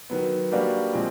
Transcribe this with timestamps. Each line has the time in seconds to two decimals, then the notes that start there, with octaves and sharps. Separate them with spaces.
0.10 D#3 F#3 B3
0.52 G3 A#3 D4 F#4 B4
0.93 A#2 F3 G#3 C4